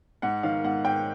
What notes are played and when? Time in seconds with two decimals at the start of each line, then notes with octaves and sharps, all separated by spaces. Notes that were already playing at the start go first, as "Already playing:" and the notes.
0.22 G#2 F#5
0.43 D#3 F5
0.64 G#2 F#5
0.85 G#2 G5